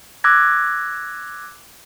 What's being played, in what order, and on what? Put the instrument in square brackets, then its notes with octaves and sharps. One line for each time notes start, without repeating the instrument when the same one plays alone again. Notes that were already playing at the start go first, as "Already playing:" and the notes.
[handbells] D6 E6 F#6 G#6 A#6